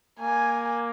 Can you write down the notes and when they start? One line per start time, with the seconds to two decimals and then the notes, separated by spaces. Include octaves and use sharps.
0.20 A#3 G#5